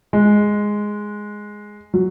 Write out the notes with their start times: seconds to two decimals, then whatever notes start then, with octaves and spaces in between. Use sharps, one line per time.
0.13 G#3
1.94 F#3